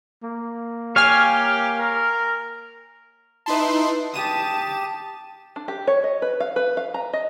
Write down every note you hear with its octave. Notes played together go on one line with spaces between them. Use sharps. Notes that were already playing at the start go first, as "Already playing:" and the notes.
A#3
G4 C#5 F5 G#5 F6
A#4
D#4 E4 B4 A5 C6
G4 A5 D#6 D#7 E7
D4
G4
C#5
D#5
B4
F5
B4
F5
A#5
D#5